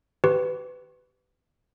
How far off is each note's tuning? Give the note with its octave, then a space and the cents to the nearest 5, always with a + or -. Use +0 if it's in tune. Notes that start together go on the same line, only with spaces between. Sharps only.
G4 -25 B4 +20 C#6 -45